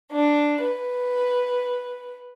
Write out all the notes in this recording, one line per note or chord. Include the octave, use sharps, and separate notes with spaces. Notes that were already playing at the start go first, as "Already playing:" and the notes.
D4
B4